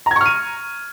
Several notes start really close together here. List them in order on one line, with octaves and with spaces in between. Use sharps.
A#5 G#6 C#6 F6 D#7